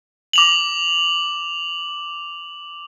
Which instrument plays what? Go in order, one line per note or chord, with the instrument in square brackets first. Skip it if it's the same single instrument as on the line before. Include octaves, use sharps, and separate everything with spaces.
[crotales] D6 F7 F#7